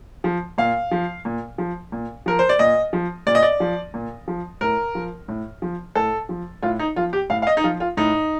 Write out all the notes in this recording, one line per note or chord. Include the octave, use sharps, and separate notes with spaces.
F3
A#2 F5
F3
A#2
F3
A#2
F3 A#4
C5
D5
A#2 D#5
F3
A#2 D5
D#5
D5
F3
A#2
F3
A2 A#4
F3
A2
F3
A2 A4
F3
A2 F4
D#4
F3 F4
G4
A2 F5
F5
D#5
D#4
F3 F4
F4
A2 D#4